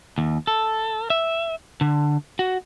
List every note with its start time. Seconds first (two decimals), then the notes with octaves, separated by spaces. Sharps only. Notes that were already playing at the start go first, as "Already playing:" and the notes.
0.18 D#2
0.47 A4
1.10 E5
1.81 D3
2.39 F#4